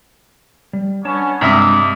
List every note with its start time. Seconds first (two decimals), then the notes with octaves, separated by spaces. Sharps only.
0.73 G3
1.05 B3 C#4 D4 C#5 A5
1.41 G2 C3 G#3 D4 E5 D6 D#6